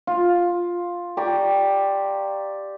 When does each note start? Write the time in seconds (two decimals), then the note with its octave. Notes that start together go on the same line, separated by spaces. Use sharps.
0.07 F4
1.17 G4 D5 A#5 C#6